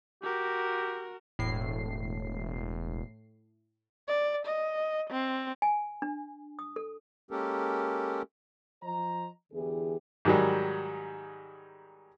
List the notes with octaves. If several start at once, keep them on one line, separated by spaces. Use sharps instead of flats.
F#4 G4 A#4
E1 A2 C7
D5
D#5
C4
G#5
D4
D#6
A4
G#3 A#3 C#4 G4 A4 A#4
F3 C5 D#5 A#5
E2 D3 E3 G4 G#4
G#2 D#3 F#3 G3